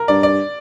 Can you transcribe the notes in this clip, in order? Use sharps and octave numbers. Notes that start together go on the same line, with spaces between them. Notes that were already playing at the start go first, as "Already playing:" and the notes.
Already playing: A#4
G2 D5
D5